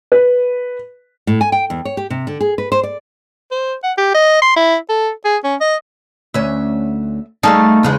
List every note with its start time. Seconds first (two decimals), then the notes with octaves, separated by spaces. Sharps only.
0.12 B4
1.27 A2
1.41 G#5
1.52 G5
1.70 E2
1.85 C#5
1.97 G4
2.10 C3
2.27 D3
2.41 G#4
2.58 B4
2.72 C5
2.83 D5
3.51 C5
3.83 F#5
3.98 G4
4.14 D#5
4.42 C6
4.56 E4
4.90 A4
5.25 G#4
5.44 C#4
5.61 D#5
6.34 D2 C#4 E5
7.43 G3 A3 D#4 G#4 F5 A5
7.83 E2 C#3 G#3